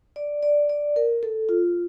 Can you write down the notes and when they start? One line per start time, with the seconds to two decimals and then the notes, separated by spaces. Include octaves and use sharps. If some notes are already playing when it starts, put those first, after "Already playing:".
0.16 D5
0.43 D5
0.69 D5
0.96 A#4
1.23 A4
1.49 F4